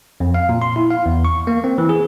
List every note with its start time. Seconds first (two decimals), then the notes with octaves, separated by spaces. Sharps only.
0.20 F2
0.34 F5
0.49 A#2
0.62 C6
0.76 E4
0.91 F5
1.06 E2
1.25 C#6
1.47 A#3
1.64 C4
1.78 E3
1.89 G#4